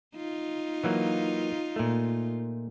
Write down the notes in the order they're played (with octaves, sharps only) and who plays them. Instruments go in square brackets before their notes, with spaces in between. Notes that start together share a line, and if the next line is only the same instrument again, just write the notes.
[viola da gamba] D#4 F4
[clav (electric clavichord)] E3 F#3 A#3
A#2 A3